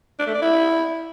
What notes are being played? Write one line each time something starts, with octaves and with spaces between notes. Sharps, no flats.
D4
A3
D5
E4